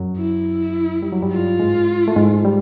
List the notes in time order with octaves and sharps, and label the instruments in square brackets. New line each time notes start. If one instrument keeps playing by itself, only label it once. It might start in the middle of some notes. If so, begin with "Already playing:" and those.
Already playing: [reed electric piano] F#2 F#3
[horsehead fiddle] E4
[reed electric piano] G3
F#3
G2 G3
[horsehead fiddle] F4
[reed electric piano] G#2 G#3
A3
G#2 G#3
G3